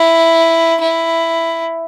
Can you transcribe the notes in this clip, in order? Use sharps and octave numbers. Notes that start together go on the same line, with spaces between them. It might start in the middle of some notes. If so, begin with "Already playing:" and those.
Already playing: E4
E4